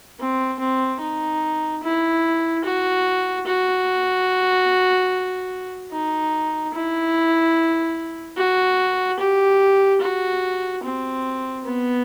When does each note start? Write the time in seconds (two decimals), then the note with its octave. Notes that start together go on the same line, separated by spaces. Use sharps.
0.20 C4
0.60 C4
1.01 D#4
1.83 E4
2.65 F#4
3.47 F#4
5.92 D#4
6.74 E4
8.37 F#4
9.20 G4
10.01 F#4
10.83 C4
11.65 B3